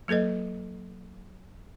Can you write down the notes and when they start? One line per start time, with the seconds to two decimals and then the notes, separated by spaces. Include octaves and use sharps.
0.08 F#3 A#3 A4 B4 D#5